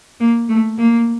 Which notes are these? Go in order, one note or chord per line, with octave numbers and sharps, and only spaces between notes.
A#3
A3
A#3